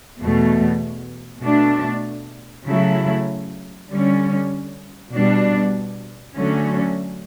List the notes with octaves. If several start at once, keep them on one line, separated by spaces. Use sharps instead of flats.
E2 B2 A3
B2 A3 D4
C#3 F#3 A3 E4
D3 G3 C#4
B2 G3 D4
D3 F#3 A3 C#4